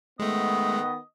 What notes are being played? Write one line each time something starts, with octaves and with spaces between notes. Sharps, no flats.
D#3 G#3 A3 B3 D#5